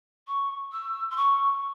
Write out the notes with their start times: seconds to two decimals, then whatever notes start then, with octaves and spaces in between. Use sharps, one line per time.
0.27 C#6
0.71 E6
1.10 C6
1.16 C#6